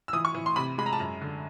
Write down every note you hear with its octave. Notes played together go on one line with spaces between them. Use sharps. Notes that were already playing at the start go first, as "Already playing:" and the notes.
E6
E3 D#6
C#6
E3
C6
C3 B5
G#3 B5
A#5
A5
F#2 A#5
D3